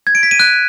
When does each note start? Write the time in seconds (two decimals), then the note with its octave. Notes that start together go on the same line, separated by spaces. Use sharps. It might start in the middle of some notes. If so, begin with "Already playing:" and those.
0.07 G#6
0.15 D7
0.23 B6
0.31 D#7
0.40 F#6